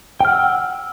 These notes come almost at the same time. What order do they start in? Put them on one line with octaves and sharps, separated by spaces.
G5 F6 F#5 E6